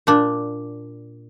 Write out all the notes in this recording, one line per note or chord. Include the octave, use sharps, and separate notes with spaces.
A#2 D4